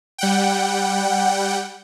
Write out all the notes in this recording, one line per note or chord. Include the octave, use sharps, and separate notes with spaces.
G3 F#5 G5